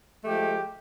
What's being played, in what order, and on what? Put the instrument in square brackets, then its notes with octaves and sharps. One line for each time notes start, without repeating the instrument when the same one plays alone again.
[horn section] F3 G#3 A3 G4